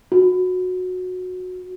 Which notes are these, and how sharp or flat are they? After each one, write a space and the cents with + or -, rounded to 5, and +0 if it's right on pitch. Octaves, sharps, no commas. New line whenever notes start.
F#4 -15